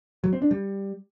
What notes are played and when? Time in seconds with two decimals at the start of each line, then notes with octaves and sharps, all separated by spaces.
0.24 F#3
0.33 C4
0.42 D4
0.51 G3